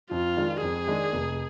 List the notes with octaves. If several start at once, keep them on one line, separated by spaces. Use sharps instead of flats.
F2 F4
D#3 G#3 D4
F2 G#4
D#3 G#3 D4
F1